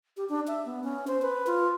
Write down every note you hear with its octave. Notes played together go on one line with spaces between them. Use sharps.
G4
D4
E5
B3
C#4
C5
B4
F4